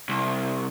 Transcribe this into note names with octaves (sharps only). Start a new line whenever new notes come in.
C2